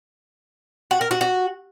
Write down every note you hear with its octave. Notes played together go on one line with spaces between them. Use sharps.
F#4
A#4
F#4
F#4